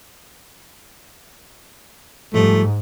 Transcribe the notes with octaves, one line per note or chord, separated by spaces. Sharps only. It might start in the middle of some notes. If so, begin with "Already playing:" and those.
G#2 F3 G3 A3